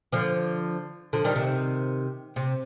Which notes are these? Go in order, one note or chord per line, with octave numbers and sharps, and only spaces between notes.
D3 F3
D3 F3
D#3 G3
C3 D#3
C3